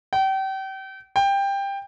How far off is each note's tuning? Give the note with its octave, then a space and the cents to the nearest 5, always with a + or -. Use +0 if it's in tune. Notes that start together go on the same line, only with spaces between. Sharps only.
G5 -35
G5 +15